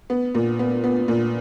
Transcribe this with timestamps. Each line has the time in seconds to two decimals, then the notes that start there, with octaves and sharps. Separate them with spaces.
0.10 B3
0.34 A#2
0.59 B3
0.84 B3
1.08 A#2